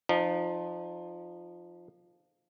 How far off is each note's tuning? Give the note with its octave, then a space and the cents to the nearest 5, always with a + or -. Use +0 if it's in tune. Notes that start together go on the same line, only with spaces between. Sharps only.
F3 +0 D#4 -30